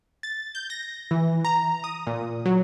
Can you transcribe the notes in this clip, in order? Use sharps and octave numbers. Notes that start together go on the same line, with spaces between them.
A6
G6
A#6
E3
A#5
D#6
A#2
F#3